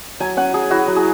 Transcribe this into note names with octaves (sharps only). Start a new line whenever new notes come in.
F#3 G#5
C#4 F#5
F#3 G#4
E4 F#4
F#3
G#4